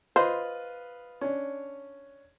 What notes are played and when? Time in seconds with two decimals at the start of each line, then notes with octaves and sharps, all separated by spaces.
0.16 F4 B4 C5 D#5
1.21 C#4 D4